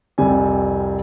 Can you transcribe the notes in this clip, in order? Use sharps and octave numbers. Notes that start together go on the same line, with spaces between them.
C2 F2 G3 C4 G#5